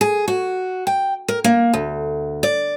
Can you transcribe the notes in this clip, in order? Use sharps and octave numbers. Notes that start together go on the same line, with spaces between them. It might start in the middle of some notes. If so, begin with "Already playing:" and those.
G#4
F#4
G5
A#4
A#3
D2
D5